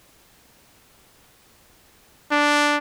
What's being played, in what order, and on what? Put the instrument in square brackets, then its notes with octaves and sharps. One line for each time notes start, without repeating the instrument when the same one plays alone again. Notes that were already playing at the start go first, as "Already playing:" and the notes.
[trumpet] D4